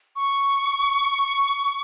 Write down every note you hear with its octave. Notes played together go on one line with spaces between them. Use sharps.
C#6